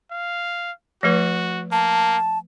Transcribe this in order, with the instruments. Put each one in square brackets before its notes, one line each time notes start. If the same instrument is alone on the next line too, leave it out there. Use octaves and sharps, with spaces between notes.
[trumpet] F5
[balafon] F3 A3 B4 [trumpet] F#4
[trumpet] A#3 [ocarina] A5